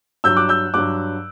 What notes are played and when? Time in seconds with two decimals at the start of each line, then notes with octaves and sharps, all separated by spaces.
0.24 G2 F#3 E6 G6
0.36 D6 F#6
0.49 E6 G6
0.74 G2 F#3 D6 F#6